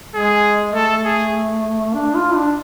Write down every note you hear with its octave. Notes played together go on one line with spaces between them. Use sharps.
G#3 G#4
A3 A4
G#4
D4
F4
D4